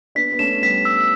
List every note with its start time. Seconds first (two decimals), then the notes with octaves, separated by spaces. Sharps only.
0.15 B3 D4 B6
0.32 B3
0.39 A3 C#4 E7
0.62 G3 B3 B6
0.85 E6